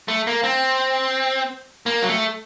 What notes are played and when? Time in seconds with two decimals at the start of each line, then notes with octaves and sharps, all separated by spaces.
0.08 A3
0.27 A#3
0.44 C4
1.86 A#3
2.02 F#3
2.08 A3